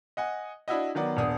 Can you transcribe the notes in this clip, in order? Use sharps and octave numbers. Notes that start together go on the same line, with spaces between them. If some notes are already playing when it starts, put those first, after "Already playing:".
D#5 F#5 G#5
D4 E4 F#4 D#5
D#3 F#3 B3 D5
D#1 B3 D4 D#6